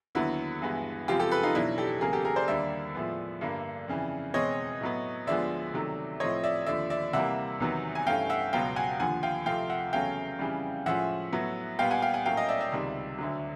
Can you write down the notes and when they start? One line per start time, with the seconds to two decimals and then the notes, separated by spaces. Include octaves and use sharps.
0.15 D#2 D3 F#3 B3 E4 F#4
0.62 G2 E3 G#3 B3
1.08 F#2 C#3 F3 G#3 C4 F4 G4
1.20 G4 A4
1.31 A4 B4
1.43 D#4 F4
1.55 E2 B2 F#3 D4 E4
1.78 G4 A4
2.01 E2 C#3 F#3 A#3 G#4 A#4
2.13 G4 A4
2.24 G#4 A#4
2.36 C5 D5
2.48 D#2 D3 G3 A#3 D5 E5
2.95 A2 F3 G#3 B3
3.41 G2 D3 G3 A#3
3.88 F2 C#3 E3
4.34 E2 B2 G#3 C4 C#5 D#5
4.81 A2 F#3 B3
5.27 D2 D3 F3 G#3 B3 D5 E5
5.73 C3 D#3 F#3 A3
6.20 A2 F3 A3 C4 C#5 D#5
6.44 D5 E5
6.66 D#2 D3 F3 A3 D5 E5
6.90 D5 E5
7.13 C3 E3 G3 A#3 E5 F#5
7.60 E2 C3 D#3 F#3 B3
7.95 G#5
8.07 G2 E3 A3 C#4 F5 G5
8.30 E5 F#5
8.53 C#2 B2 F#3 B3 F5 G5
8.76 F#5 G#5
9.00 D#2 D3 F3 F#5 G#5
9.23 F5 G5
9.46 C2 C3 F3 A3 C4 F5 G5
9.70 E5 F#5
9.93 E2 C#3 F#3 A3 C#4 F5 G5
10.39 F2 C#3 E3 G3
10.86 A2 F3 G#3 C#4 E5 F#5
11.32 A2 F#3 B3
11.79 A#2 G3 B3 F5 G5
11.90 F#5 G#5
12.02 F5 G5
12.14 F#5 G#5
12.26 A2 F#3 A#3 C#4 F5 G5
12.37 D#5 F5
12.49 D5 E5
12.60 D5 E5
12.72 C#2 C3 D#3 G3
13.18 D2 D3 F#3